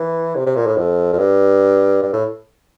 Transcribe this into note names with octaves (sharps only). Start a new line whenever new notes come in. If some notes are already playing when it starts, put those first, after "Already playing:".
Already playing: E3
C3
C3
A#2
A2
F2
F2
G2
G2
A2